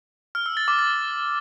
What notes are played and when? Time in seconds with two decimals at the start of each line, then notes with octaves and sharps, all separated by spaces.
0.35 F6
0.46 E6
0.57 A6
0.68 D6
0.79 A6